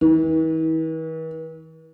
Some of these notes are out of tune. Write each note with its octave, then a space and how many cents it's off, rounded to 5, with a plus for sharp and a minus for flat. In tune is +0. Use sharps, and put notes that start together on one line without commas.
E3 -45